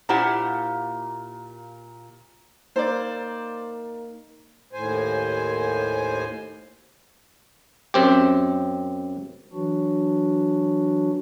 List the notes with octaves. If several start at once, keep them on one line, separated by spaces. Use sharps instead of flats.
A#2 A#3 E4 G4 C5 F#5
A#3 D#4 A#4 C5 D5
D#2 A2 C5 G#5
F#2 C4 G4
E3 F#3 D4 F#4